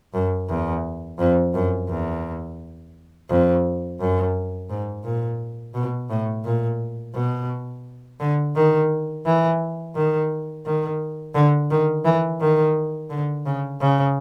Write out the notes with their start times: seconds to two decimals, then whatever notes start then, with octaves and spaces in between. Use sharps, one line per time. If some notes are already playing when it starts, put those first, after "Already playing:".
0.14 F#2
0.49 E2
1.19 F2
1.54 F#2
1.89 E2
3.30 F2
4.00 F#2
4.70 G#2
5.04 A#2
5.74 B2
6.10 A2
6.44 A#2
7.15 B2
8.20 D3
8.55 D#3
9.25 E3
9.95 D#3
10.66 D#3
11.35 D3
11.71 D#3
12.05 E3
12.40 D#3
13.10 D3
13.46 C#3
13.81 C#3